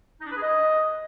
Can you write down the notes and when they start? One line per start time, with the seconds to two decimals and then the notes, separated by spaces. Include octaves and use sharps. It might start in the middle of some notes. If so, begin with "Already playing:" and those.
0.20 D#4
0.26 D4
0.31 B4
0.36 G#4
0.42 D#5